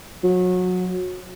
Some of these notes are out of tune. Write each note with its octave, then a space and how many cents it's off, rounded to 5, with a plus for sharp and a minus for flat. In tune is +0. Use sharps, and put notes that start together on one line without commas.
F#3 -25